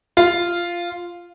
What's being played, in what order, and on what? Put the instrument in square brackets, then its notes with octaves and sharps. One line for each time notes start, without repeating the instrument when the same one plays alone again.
[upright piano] F4